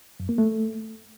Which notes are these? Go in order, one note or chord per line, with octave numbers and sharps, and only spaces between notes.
F#2
A#3
A3